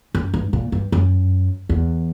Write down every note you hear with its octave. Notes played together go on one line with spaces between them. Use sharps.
F#2
G2
A#2
G2
F#2
E2